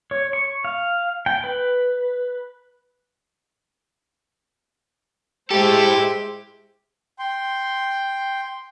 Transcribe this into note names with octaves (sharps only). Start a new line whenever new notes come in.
C#5
C#6
F5
G5
B4
G#3 E4 G4 A4 C5 E5
G5 C6